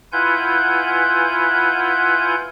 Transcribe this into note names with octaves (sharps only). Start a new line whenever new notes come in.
E4 F4 B4 F#5 G#5 G6